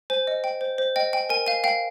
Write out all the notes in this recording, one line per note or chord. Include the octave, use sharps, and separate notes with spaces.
C5 G#5
D#5
G5
C5
C5
D#5 G5
G5 G#5
A#4 G#5
F5 G#5
F5 G5